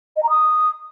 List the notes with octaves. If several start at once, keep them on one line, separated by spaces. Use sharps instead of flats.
D#5
A#5
D#6